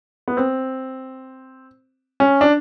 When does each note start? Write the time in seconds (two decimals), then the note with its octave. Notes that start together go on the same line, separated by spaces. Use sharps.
0.28 B3
0.37 C4
2.20 C#4
2.41 D4